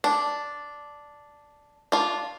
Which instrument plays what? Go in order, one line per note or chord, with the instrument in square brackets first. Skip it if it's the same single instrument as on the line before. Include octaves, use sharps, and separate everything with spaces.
[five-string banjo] D4
D4 F4